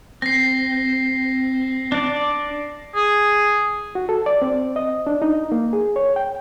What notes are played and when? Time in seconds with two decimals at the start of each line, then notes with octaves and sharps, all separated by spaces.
0.22 C4 A#6 C7
1.92 D4 D5
2.95 G#4
3.95 F#4
4.09 A4
4.26 D5
4.42 C4
4.76 D#5
5.07 D4
5.22 D#4
5.52 A#3
5.73 G#4
5.96 C#5
6.16 G5